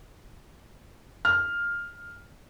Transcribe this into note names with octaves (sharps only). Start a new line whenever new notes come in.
F6